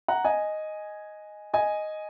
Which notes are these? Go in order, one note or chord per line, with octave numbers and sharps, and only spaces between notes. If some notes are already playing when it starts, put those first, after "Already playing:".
F#5 A#5
D#5 G#5
D#5 G#5